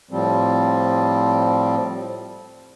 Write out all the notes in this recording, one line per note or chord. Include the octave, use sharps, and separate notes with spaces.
A2 F3 G3 C4